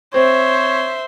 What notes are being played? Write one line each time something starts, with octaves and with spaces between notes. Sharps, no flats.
C4 C5 C#5 E5